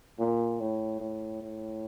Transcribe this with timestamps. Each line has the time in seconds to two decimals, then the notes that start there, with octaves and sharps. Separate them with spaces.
0.19 A#2
0.60 A2
1.00 A2
1.42 A2